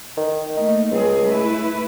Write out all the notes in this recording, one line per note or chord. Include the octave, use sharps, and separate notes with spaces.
D#3
A3 A#3 D#4
C#2 G3 C4 G#4
A3 E4 B4